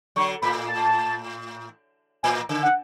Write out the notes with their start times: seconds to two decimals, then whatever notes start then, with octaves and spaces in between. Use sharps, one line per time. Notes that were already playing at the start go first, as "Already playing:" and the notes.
0.16 D3 F#3 C#6
0.42 A2 B5
0.68 A5
2.23 A2 G#5
2.49 C#3
2.63 F#5